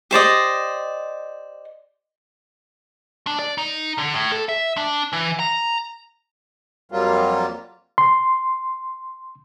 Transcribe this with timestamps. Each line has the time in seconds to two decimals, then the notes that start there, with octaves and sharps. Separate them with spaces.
0.11 G4 C5 D5 D#5
3.27 D4
3.39 D5
3.58 D#4
3.98 D3
4.14 A2
4.32 A4
4.49 E5
4.77 D4
5.13 E3
5.39 A#5
6.92 F2 F#3 G3 A#3 F4
7.98 C6